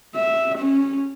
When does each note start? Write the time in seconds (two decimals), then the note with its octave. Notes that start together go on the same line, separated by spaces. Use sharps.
0.15 E5
0.58 C#4